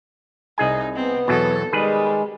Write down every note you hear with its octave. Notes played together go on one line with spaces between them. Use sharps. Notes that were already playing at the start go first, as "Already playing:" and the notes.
C2 D#4 G#4 G#5
B3 C4
E2 B2 F#3 A4
D#3 G3 G#3 G#4 B4